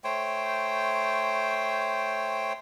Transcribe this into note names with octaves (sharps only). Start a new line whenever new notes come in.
A3 C5 C#5 G5